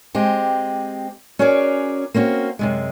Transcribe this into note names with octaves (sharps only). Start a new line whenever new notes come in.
G#3 C4 G4
C#4 F#4 G#4 A#4 C#5 D5
A#3 C4 C#4 F#4
F#2 C3 G#3